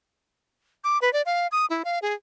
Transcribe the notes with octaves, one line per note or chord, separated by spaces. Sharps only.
D6
B4
D5
F5
D#6
E4
F5
G#4